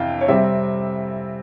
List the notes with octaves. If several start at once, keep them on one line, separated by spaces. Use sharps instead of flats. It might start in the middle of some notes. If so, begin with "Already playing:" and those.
Already playing: F2 C3 E3 F5 G5
C#5
C3 G3 C4 E5